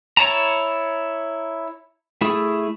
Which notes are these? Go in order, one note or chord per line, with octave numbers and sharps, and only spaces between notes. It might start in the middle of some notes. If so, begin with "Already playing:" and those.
E4 C#5 A5 A#5
A3 E4 G#4